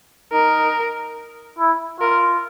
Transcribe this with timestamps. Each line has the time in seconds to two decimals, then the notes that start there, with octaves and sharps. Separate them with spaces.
0.33 D#4 A#4
1.59 E4
2.00 F4 A#4